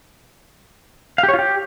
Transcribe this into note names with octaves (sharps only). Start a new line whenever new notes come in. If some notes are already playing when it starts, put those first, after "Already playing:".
F5
G4
C#5
F4
G4